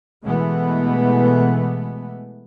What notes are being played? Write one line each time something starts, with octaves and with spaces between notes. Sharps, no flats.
B2 E3 G#3 A3 B3